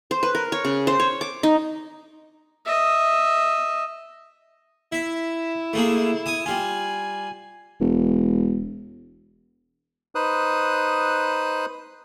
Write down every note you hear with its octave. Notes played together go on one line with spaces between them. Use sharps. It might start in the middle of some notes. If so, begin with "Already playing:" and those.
C5
B4
A#4
C#5
C#3
C5
C#5
D6
D#4
D#5 E5
E4 E5
A3 A#3 G#4
G#5 D#6
G3 F4 G#5
E1
D#4 B4 C5 D#6 F#6